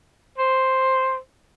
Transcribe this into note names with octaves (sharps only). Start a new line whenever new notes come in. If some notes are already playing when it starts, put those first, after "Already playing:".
C5